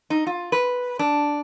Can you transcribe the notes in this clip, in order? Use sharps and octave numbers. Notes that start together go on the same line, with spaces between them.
D#4
F4
B4
D4